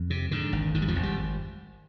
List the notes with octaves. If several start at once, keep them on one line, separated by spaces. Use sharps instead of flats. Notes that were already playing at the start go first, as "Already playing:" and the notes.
Already playing: F2
C3
G#2 D3
G#1
G#2 D#3
G3
F2 F3
G#1
G3